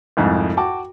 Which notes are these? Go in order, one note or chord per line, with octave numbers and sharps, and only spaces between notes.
C2 F2 G#2
F#4 G5 A5 D6